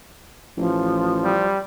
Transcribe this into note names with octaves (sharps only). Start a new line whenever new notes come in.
A1 F3
G3